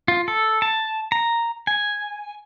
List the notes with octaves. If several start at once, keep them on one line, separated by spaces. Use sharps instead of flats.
F4
A4
A5
A#5
G#5